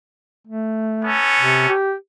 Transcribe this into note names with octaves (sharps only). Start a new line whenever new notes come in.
A3
B3 C#4 A4
C3
G4